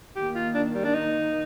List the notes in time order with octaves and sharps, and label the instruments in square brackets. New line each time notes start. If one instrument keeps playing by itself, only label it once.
[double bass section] D#3 A#3 [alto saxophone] G4
[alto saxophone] F4
D4
G3
D4
D#4